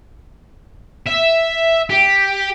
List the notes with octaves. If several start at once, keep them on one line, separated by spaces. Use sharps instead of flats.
E5
G4